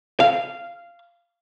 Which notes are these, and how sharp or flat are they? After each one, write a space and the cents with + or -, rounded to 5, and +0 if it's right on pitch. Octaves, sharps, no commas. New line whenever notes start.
F5 -15